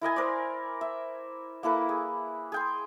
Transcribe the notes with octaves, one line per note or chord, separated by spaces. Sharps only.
E4 A#4 D#5 G#5
A#4 C5 D5
E5
A#3 E4 A4 B4
G#4
G#4 G5 C6